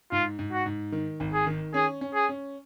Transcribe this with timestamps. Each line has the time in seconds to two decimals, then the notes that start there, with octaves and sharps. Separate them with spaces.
0.12 G#2 F4
0.39 G#2
0.52 F#4
0.66 G#2
0.92 D#3
1.20 G#1
1.33 G#4
1.46 D#3
1.74 C#4 G#4
2.01 C#4
2.15 G#4
2.29 C#4